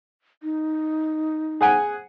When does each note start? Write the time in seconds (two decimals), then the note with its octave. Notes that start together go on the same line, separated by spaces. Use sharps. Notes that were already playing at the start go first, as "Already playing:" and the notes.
0.43 D#4
1.61 G#4 F#5 G#5